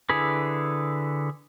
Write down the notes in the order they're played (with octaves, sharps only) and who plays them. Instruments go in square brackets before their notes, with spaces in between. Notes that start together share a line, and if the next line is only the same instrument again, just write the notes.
[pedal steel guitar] D3 E4 G#4 B4